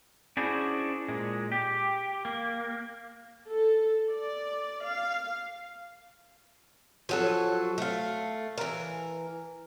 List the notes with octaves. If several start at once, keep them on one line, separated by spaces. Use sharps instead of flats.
C#4 D4 E4 F#4 G#4 C5
A#2 G#3
G4
A#3
A4
D5
F5
F3 F#3 A4
A3 F5
E3 A#4